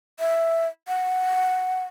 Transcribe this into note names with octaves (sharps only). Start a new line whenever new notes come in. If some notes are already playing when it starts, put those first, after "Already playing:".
E5
F#5